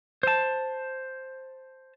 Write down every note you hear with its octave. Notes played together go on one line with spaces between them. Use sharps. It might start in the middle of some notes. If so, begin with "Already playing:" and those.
C5 A5